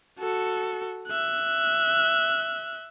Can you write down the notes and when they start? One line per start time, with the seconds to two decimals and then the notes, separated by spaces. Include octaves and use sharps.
0.19 F#4 A4
1.08 E5 F#6